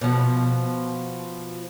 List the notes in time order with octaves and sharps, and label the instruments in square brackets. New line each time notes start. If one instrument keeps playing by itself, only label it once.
[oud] B2 F3